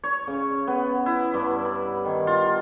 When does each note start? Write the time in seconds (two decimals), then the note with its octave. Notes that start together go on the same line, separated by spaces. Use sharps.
0.04 C#5
0.27 C#3
0.67 B3
1.06 E4
1.34 G2
1.65 B5
2.05 D#3
2.27 F4